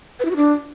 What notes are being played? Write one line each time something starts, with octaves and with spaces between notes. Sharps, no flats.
B4
E4
F#4
D4